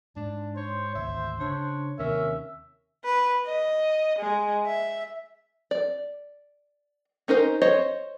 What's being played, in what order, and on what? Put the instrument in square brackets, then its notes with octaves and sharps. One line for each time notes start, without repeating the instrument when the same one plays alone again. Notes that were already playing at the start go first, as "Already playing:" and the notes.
[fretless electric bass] G#2 [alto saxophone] D4
[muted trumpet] C5 [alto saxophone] C#5
[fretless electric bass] G#1 D2 [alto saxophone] E5
[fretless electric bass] C#3 [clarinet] D4 [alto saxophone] C#5
[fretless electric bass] D#2 C3 D#3 [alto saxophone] C#4 [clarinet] A#4 [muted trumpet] E5
[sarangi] B4
D#5
G#3
E5
[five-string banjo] D5
C#4 D#4 A#4 C5
C5 C#5 D#5